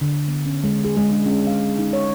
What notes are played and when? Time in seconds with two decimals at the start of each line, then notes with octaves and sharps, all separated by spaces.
0.01 D3
0.28 B3
0.46 C#4
0.64 G#3
0.84 G#4
0.97 G#3
1.11 D4
1.26 C#4
1.47 F5
1.79 D#4
1.93 C#5